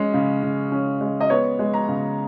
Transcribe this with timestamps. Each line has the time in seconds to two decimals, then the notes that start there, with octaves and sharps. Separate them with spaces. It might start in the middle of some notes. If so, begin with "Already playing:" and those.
Already playing: G#3 C#4
0.14 C#3
0.43 C#3
0.72 C#4
1.01 G#3
1.21 D#5
1.30 B3 C#5
1.59 G#3
1.74 A#5
1.88 C#3